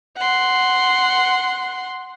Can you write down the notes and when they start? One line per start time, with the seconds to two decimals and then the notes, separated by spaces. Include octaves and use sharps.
0.17 F#5 C6